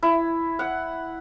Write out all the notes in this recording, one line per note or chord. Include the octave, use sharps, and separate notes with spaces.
E4
F#5